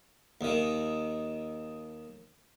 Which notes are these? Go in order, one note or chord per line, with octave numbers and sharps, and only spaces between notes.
D#2 D#3